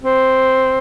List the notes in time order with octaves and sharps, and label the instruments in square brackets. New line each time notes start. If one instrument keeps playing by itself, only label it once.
[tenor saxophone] C4